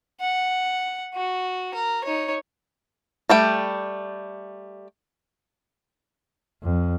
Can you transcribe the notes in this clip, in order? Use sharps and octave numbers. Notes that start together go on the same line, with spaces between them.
F#5
F#4
A#4
D#4 C#5
G3 A3 G5
F2